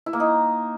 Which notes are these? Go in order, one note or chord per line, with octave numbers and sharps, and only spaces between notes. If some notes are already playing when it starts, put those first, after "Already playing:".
E4
A#3
D#4